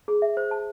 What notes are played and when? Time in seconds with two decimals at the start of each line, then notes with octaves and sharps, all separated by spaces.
0.08 G#4
0.22 E5
0.37 C5
0.51 A5